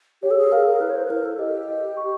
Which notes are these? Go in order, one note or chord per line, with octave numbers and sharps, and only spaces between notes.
G4 C#5
A4
G#4
A#4 F5
A#4
E4 B4
C#5
C5
B4
E4 A#4
A4
G4 D#5
D#5
C#6